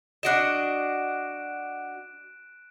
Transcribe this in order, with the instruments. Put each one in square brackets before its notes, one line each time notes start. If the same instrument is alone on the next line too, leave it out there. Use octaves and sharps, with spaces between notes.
[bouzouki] D4 F#4 D#5 [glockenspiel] F#6 D7 E7